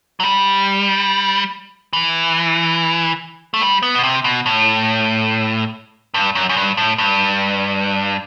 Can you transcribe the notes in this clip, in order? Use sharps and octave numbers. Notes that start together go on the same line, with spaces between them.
F#3
G3
E3
A3
G3
B3
B2
C3
B2
A2
G2
F#2
F#2
G2
A2
G2